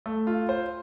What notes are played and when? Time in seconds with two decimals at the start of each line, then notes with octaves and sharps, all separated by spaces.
0.06 A3
0.27 F4
0.49 C5